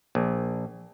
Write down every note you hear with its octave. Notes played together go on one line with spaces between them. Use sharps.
A#1